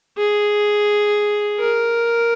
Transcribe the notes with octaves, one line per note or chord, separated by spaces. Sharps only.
G#4
A#4